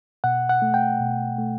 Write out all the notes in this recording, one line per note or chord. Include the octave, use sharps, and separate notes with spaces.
B2 F#5
F#5
A3
G5
B2
A3